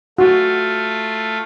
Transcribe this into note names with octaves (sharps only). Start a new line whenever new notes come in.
A3 F4 F#4